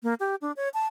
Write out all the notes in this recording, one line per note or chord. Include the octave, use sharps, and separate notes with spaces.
A#3
G4
D4
C#5
A5